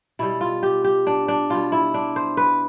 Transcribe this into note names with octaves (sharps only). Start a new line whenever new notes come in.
B2 G3 E4
F4
G4
G4
D4
D4
B2 G3 F4
E4
D4
C5
B4